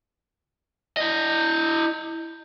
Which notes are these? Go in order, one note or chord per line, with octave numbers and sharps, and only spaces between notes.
E4 D#5